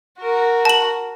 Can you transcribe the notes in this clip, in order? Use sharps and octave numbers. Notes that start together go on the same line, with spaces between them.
F#4 A#4
A5 F#7